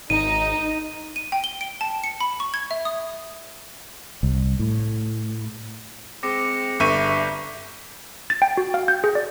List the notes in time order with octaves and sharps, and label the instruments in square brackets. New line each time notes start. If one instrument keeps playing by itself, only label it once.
[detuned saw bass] G#1 [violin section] D#4 [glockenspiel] D#7
[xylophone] D#7
G5
G7
D7
A5
C#7
B5
C#6
G#6
E5
D#6
[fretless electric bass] C2
A2
[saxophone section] G#3 C4 [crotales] D6 A#6 C#7
[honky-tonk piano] G1 C#6 D#7 [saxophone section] G2 E5
[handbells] A6
G5
F#4
F5
G6
G#4
D5